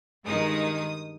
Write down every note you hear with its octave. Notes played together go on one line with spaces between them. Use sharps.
G2 D#3 G#3 D#4 D#6